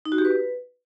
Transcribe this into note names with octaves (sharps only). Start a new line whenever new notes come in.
D#4
F#4
G4
B4